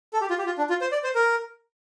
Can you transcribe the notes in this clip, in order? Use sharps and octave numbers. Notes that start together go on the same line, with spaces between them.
A4
G4
F4
G4
F4
D4
F4
C5
D5
C5
A#4